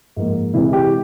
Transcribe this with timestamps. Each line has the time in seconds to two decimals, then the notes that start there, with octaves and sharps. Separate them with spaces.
0.17 G#2 F3 A#3
0.54 C3 E3 G#3 E4
0.73 G4